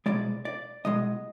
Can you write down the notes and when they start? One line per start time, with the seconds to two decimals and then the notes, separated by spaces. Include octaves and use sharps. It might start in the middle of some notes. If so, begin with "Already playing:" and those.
0.06 C2 B2 G#3 D5
0.45 D5
0.85 C2 B2 G#3 D#5